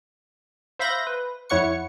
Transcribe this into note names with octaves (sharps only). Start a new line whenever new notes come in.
C5 E5 F5 B5 G6 A#6
B4
F2 E4 C#5 F#5 C#6 C#7